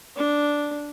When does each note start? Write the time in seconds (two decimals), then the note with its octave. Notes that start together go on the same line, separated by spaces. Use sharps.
0.16 D4